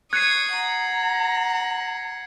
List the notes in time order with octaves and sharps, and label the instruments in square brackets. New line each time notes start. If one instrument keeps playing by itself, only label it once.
[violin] C#6 D#6 [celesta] F#6 C#7 D#7 [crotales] G#6 C7
[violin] F#5 [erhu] A#5